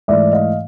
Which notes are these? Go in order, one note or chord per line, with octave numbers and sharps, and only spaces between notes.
G#2 E3 A3 D5 E5
D#5 F5